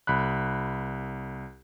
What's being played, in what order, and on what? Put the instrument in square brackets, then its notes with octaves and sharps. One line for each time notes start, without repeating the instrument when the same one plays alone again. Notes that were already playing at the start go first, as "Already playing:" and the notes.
[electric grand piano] C2 B5 F#6